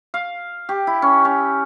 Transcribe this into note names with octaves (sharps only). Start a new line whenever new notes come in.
F5
G4
E4
C#4
C#4